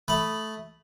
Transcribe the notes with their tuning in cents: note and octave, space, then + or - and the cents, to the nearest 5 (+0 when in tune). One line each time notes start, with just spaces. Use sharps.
A3 -10 B5 +0 D#6 -5